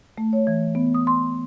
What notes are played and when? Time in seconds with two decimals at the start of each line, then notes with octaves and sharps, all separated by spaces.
0.18 A3
0.33 C#5
0.47 E3
0.75 B3
0.94 D#6
1.07 C6